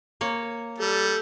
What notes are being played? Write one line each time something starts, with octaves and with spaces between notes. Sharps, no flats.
A#3 C#5
G3 A4